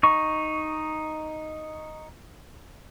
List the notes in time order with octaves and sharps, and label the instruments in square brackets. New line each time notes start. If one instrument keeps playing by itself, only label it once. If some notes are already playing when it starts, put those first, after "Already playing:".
[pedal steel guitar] D#4 C#6